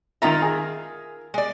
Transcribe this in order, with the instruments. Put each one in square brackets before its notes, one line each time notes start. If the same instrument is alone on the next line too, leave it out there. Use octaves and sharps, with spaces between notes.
[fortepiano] D#3 A#5 [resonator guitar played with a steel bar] F4 A#4 E5
[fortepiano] G#4
[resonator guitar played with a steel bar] G#3 D5